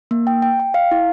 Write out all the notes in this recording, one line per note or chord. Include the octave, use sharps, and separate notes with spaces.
A#3
G5
G5
G5
F5
E4